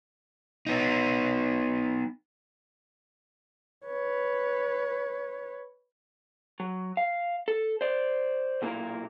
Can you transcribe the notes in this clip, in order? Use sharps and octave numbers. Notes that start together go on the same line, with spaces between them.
B3 D#4
B4 C#5
F#3
F5
A4
C5 D5
B1 A#2 A#3 B3 E4 A#4